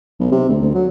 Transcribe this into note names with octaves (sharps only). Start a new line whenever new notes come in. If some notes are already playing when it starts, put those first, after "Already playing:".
B1
C3
D2
D2
F#3